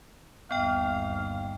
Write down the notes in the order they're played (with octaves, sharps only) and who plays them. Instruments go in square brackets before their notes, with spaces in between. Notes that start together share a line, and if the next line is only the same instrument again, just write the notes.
[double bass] G1 D#2 [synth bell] B3 G5 [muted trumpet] F5